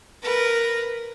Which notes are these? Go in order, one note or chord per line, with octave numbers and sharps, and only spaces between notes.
A#4 B4